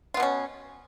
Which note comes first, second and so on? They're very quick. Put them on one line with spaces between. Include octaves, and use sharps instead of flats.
F4 B3 B2 C#4